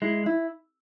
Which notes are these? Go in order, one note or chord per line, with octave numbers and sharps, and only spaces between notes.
G#3 E4
E4